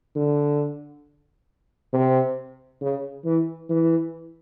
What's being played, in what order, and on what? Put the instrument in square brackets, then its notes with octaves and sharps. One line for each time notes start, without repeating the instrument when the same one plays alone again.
[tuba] D3
C3
C#3
E3
E3